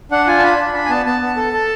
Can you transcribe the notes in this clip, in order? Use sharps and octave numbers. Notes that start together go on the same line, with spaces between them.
D4 F#5
F4 G#5
A5
D4 B5
D4
D4 B5
G#5
B3 A5
B3 A5
B3
A4
A4